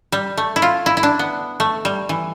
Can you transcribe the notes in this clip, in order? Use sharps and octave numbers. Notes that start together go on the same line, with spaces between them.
G3
A3
E4
F4
E4
E4
D4
B3
A3
G3
E3